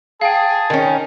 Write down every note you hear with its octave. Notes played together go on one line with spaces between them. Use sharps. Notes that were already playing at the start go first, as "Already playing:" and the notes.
G#4 F5 G5 A5
D#3 C#4